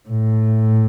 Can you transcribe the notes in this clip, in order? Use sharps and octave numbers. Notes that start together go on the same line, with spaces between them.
A2